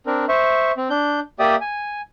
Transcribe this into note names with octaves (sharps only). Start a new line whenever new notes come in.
C4 D4 A#4
C5 E5 C#6
C4
D4 G6
A#3 G4 D5 E5 G5 D#6
G#5